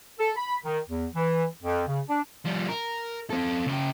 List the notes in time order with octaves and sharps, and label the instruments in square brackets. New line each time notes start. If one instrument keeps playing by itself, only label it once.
[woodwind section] A4
B5
D#3
E2
E3
F2
C#3
D4
[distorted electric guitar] F3 G3
A#4
C4 A4
C#3 G5